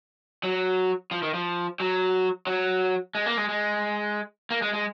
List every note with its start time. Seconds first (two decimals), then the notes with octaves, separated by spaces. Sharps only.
0.43 F#3
1.11 F3
1.23 D#3
1.34 F3
1.80 F#3
2.47 F#3
3.15 G#3
3.26 A#3
3.37 G#3
3.49 G#3
4.51 A#3
4.62 G#3
4.73 G#3